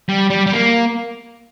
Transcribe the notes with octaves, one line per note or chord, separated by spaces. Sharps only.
G3
G3
G3
A#3